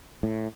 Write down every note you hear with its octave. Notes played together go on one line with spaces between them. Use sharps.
A2